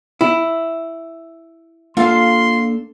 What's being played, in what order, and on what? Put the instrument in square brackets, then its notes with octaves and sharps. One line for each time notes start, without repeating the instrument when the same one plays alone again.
[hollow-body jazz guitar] E4
[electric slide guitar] A#3 D4 A4 [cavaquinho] F4 F5 [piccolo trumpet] C6